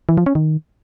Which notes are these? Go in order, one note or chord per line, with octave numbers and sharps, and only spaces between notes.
E3
F3
C#4
D#3